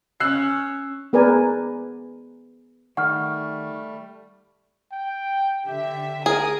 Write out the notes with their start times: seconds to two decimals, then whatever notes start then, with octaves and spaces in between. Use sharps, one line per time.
0.20 C#4 E6 F#6 C7
1.13 B3 G#4 A#4 B4 D5 G#5
2.97 D#3 G3 A3 F#5 C#6 F6
4.92 G5
5.67 D3 G4 E5
6.26 G#4 A#4 D#6